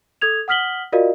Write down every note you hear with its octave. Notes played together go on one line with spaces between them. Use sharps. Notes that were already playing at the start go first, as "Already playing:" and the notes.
A4 D#6 G#6 F7
F#5 D#6 F6 B6 F#7 G7
F4 F#4 A#4 D5 D#5 F5